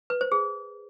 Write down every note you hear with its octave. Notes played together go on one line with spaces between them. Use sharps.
B4
C5
G#4